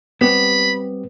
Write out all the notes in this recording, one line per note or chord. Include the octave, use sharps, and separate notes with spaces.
G3 B3 C4 G4 B5